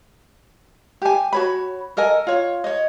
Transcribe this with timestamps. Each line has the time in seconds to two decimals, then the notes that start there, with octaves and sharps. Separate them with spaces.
1.02 G4 G#5
1.33 F#4 C#5 B5
1.97 A4 A#4 D#5 G#5
2.27 F4 C#5
2.64 C#5 D#5